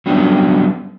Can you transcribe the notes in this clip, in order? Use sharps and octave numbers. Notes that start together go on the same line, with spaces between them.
F#3 G3 B3 C#4 D4